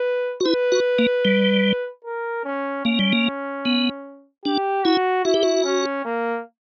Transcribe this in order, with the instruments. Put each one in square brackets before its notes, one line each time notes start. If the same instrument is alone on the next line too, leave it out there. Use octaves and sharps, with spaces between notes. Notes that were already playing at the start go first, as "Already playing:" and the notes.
Already playing: [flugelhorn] B4
[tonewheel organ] F#4
[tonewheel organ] E4 [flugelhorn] B4
[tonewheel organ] F#4
A#3
G3
[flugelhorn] A#4
C#4
[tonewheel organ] A#3 [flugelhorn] C#4
[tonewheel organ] G3
A#3
B3
[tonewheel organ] D4 [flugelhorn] G4
[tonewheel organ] E4 [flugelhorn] F#4
[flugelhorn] E4 [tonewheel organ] F#4
[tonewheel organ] G4
F#4
[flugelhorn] C#4
A#3